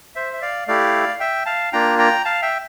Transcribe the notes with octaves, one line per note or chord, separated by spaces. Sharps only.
C5 E5
E5
D5 F5
A3 E4 G4 D5 F5
E5 G5
F5 A5
A#3 D4 F4 G5 A#5
G5 A#5
F5 A5
E5 G5